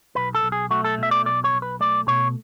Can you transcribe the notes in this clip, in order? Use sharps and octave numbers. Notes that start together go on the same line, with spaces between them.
B1 B4
A4
B1
G#4
A3 F#4
A4
B2 E5
D5
B1 D5
C#5
B1
B4
A3 D5
B2 C#5